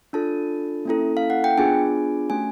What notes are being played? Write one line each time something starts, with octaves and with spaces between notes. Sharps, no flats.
D4 F4 A4 A5
A#3 C#4 E4 A4
F5
F#5
G5
B3 D4 F4 G#4 G#5
A3 C#4 F#4 G#5